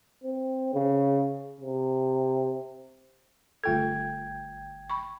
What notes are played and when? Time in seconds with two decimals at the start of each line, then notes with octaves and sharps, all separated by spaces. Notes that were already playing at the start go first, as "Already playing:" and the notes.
0.24 C4
0.74 C#3
1.61 C3
3.64 G1 A3 F4 A4 G5 G#6
4.90 B5 C#6